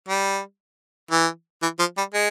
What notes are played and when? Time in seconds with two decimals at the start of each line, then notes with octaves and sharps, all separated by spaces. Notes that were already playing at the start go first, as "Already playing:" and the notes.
0.08 G3
1.11 E3
1.62 E3
1.79 F3
1.98 G3
2.14 G#3